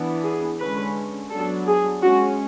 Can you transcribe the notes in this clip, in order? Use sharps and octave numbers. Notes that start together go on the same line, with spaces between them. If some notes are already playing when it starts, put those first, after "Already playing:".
Already playing: E3 B3 D4
G#4
D3 G#3 C#4 B4
F#3 B3 D4 A4
G#4
G#3 C#4 F#4